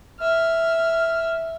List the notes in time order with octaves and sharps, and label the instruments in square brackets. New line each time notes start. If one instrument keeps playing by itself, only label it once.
[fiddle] E5 F6